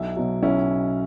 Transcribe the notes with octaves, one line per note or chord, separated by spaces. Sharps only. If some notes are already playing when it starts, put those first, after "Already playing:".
Already playing: B1 E4
B2 F#3
B1 C#4 E4